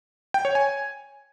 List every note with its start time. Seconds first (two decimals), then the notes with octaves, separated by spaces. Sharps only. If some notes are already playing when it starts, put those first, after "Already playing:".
0.34 G5
0.45 C#5
0.55 G#5